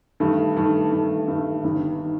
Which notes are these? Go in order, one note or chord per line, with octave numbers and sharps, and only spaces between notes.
G2 D#3 A3
G2 D#3 A3
G2 D#3 A3
G2 D#3 A3
G1 G2 D#3
D#3